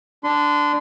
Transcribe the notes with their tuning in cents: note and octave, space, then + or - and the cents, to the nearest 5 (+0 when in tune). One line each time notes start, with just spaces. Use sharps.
D4 +0 C6 -30